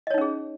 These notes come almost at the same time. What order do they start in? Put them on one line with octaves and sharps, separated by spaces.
D#5 C#5 D#4 C#4 G#4